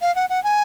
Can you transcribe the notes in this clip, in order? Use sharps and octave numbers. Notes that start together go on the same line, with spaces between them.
F5
F#5
F#5
G#5